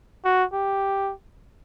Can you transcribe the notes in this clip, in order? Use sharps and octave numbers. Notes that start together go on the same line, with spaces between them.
F#4
G4